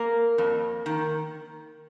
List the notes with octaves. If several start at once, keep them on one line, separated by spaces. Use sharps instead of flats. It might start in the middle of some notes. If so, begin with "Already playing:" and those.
Already playing: A#3 A#4
F2
D#3